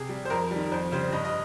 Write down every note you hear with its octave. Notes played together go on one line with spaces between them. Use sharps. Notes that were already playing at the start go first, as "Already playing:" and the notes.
Already playing: C3 G#4
G3
C5
F2 A#4
D#3 G3
F2 C5
C#3 G3 C5
G2 D#5
D#5